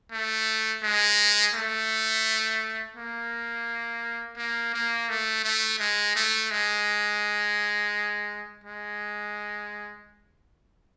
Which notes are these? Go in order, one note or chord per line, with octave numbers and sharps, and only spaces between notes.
A3
G#3
A3
A#3
A#3
A#3
A3
A3
G#3
A3
G#3
G#3